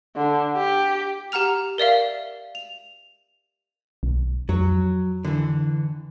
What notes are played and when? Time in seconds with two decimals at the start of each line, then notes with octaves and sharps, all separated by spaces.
0.16 D3
0.56 G4
1.32 G4 F#5 A#5 F6 F7
1.78 A#4 D5 E5 F5
2.55 F7
4.03 B1
4.49 F2 F#3
5.25 D3 E3